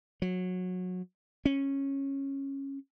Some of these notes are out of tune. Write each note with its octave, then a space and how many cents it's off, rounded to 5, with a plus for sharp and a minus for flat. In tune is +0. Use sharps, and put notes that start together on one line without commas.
F#3 -20
C#4 -15